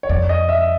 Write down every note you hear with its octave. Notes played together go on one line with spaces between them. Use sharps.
C#5
F2 D5
D#5
E5